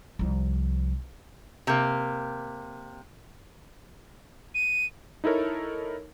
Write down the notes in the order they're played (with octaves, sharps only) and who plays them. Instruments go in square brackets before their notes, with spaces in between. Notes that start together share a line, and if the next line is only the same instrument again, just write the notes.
[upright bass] C2 F3
[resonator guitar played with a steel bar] C3 A#3
[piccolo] D#7
[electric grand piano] D#4 E4 A4 A#4 C#5